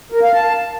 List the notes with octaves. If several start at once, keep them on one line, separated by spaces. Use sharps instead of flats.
A#4
F5
A5